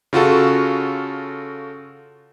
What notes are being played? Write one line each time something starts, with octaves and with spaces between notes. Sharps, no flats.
C#3 F4 F#4 A4